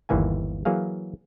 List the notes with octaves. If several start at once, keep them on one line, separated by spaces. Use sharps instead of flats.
G1 D#2 E3 A#3 G#5
E3 F#3 A#3 G#4 F5